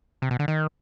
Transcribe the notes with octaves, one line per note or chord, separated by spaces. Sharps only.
C3
B2
D3
D#3